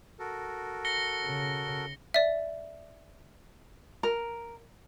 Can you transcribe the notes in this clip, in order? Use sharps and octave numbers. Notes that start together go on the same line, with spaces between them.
F#4 A4 A#4
A#6 C#7 G7
C#3
D5 E5
A#4